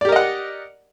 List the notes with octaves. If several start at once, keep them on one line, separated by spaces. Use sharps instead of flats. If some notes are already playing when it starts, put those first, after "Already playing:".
G4 A#4 D5 D#5 F#5